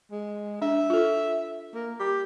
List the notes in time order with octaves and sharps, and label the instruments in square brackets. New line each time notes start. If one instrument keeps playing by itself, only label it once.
[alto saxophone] G#3
[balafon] D4 [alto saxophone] E5
[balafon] F4 A4
[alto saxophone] A#3
G4